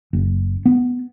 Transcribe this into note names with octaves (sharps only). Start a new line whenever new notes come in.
F#1
B3